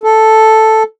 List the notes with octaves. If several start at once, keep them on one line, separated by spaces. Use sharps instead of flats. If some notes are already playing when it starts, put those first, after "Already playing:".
A4